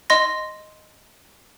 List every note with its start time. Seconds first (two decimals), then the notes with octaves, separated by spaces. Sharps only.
0.10 D#5 C6 A#6